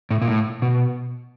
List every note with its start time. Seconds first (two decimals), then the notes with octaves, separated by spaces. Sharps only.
0.11 A2
0.22 A#2
0.28 A2
0.62 B2